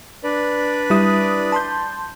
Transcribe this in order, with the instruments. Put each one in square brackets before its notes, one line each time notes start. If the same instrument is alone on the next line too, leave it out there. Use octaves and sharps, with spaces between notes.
[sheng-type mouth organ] D4 B4 D5
[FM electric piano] G3 E4 D#6
A5 C6 G6